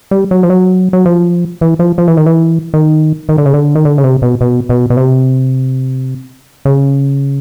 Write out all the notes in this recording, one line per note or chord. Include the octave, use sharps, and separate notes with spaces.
G3
F#3
F3
F#3
F#3
F3
E3
F3
F3
E3
D#3
E3
D#3
D#3
D3
C#3
D3
D#3
D3
C#3
C3
B2
B2
B2
B2
C3
C#3